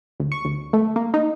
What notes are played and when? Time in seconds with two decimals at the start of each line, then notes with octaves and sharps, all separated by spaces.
0.20 D2
0.32 C#6
0.45 D2
0.73 A3
0.96 A#3
1.14 D#4